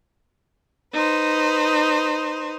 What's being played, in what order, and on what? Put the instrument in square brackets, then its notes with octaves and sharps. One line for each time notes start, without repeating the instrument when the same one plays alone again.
[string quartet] D#4 B4 C5